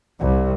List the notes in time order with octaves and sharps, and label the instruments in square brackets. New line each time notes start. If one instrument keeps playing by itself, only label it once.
[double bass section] C2